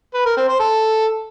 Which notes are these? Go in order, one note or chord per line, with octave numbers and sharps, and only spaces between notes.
B4
A#4
C4
C5
A4